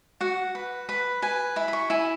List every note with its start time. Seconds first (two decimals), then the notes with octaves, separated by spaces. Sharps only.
0.21 F#4 F#5
0.55 B4
0.89 B4 B5
1.22 B4 G#5
1.56 E4 B5
1.68 B5
1.73 C#6
1.90 E4 G#5